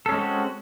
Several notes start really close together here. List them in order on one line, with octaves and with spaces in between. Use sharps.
A4 C#4 G#3 C4 F#4